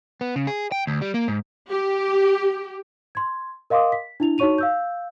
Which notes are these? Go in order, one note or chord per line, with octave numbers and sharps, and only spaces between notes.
B3
C#3
G#4
G5
D2
G3
A#3
G#2
G4
C6 G#6
A#4 D#5 F5 C6 D6 D#6
B6
D4 E4 F7
D#4 F#4 C#5 C#6 D#7 F7
F5 E6 G6